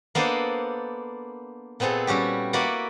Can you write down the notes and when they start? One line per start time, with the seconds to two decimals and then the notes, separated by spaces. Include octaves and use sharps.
0.15 A#3 B3 D4 A4 C5 D#5
1.80 A#2 B3 C4 G#4 A4
2.07 G3 C#4 F#4 G4
2.53 A#3 E4 F#4 B4 D5 F#5